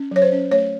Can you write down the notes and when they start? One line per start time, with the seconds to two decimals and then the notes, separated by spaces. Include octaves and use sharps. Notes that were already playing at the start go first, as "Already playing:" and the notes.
Already playing: C#4
0.11 F#3 C#5
0.22 C5
0.32 C#4
0.51 A3 C#5